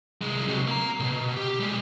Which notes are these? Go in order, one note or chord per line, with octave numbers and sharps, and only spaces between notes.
C2 G#3
C3 F#3
A#3 A#5
B1 B2
G4
G3 G#3